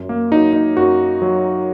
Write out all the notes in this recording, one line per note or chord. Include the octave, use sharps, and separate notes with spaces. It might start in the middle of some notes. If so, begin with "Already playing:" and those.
Already playing: F#2
A#3
F#3 D#4
D#4
F#2 F#4
F#3